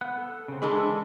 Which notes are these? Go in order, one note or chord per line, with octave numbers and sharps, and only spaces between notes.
B3 F#5 F#6
A4
C#3 C4
E3 G#3 D4 A4 B5 C6